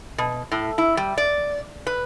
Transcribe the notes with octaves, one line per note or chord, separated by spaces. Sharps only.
B2
A2
E4
G3
D5
B4